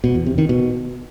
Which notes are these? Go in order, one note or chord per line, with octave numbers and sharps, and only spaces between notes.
B2
E2
C3
D#3
B2